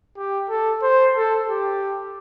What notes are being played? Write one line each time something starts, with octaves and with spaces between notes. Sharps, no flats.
G4
A4
C5
A4
G4